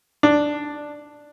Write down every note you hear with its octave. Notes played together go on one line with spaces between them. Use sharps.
D4